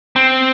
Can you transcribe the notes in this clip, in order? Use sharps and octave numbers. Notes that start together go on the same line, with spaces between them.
C4